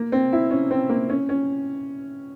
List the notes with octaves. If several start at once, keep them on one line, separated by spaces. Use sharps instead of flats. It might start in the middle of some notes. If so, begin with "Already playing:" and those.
Already playing: A#3
C4
E4
C#4
C4
A#3
C#4
C#4